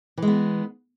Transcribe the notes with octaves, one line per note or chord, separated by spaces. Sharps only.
E3 G#3 B3